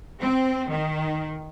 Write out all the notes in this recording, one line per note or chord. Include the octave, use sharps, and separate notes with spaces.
C4
D#3